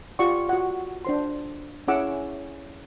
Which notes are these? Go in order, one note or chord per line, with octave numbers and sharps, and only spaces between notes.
F4 G4 D5 F#5 C#6
F#4 F#5
D4 C5 C6
C#4 E4 G#4 F#5 D6 E6